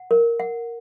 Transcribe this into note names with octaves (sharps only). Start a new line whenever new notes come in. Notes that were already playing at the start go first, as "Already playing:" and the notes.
Already playing: F#5
A#4
F#5